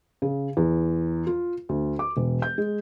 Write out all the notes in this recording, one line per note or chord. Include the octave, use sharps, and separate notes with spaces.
C#3
E2
F4
D2
D6
E1
G6
G#3